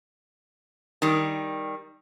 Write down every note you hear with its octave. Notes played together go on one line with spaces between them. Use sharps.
D#3 G3